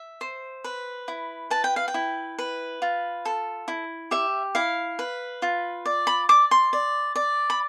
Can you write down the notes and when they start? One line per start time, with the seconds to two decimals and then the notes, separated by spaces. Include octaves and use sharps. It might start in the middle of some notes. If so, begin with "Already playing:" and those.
Already playing: E5
0.21 C5
0.64 B4
1.08 E4
1.50 B4 A5
1.64 G5
1.76 F5
1.88 G5
1.94 E4
2.38 B4
2.82 F4
3.25 A4
3.68 E4
4.11 G4 E5
4.55 E4 F5
4.99 B4
5.42 F4
5.86 D5
6.07 B5
6.29 D5 D6
6.51 C6
6.73 D5
7.15 D5
7.50 B5